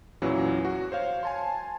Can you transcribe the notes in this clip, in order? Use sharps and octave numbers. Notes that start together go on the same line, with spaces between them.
E2 A#2 E3 F#3 C#4
F#4
C5 C#5 F5
G#5 A5 C6